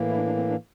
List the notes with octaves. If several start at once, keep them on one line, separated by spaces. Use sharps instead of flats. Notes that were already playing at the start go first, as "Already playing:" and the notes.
Already playing: A2 E3 A#3
E4
D4
D4
C4
D4